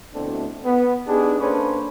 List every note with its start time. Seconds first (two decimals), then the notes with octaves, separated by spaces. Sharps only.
0.14 D2 B2 A3 C4 D4 E4
0.65 B3
1.07 B3 D4 D#4 G4 G#4
1.40 A#3 C#4 D4 A4 B4 C5